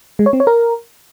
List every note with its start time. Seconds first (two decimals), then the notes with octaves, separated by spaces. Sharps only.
0.19 G#3
0.26 C#5
0.33 C4
0.40 C#5
0.47 A#4